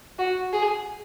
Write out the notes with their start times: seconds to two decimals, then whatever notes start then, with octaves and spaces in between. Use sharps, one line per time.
0.18 F#4
0.53 G#4